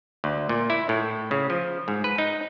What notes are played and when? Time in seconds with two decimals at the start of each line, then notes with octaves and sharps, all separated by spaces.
0.24 D2
0.49 A#2
0.70 E4
0.89 A2
1.31 C#3
1.50 F3
1.88 G#2
2.04 B4
2.18 D#4